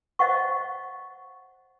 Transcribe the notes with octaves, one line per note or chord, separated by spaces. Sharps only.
C5 D#5 F5 F#5 C#6